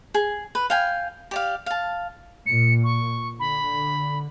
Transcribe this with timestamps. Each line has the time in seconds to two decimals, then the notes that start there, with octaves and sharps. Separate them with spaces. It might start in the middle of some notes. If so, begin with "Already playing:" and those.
0.14 G#4
0.55 B4
0.70 F5 G5 G#5
1.31 G4 D5 F5
1.66 F5 A5
2.46 A#2 C#7
2.84 C#6
3.40 D3 B5